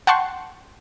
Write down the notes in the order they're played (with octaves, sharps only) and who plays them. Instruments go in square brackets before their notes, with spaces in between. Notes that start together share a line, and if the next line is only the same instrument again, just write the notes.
[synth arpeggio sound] F#5 G5 A5 C6 C#6